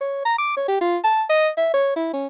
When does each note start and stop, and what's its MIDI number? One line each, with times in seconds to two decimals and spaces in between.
0.01 0.25 73
0.25 0.36 82
0.38 0.55 86
0.57 0.66 73
0.68 0.77 67
0.81 0.97 65
1.04 1.23 81
1.30 1.49 75
1.57 1.70 76
1.74 1.95 73
1.96 2.10 64
2.13 2.27 61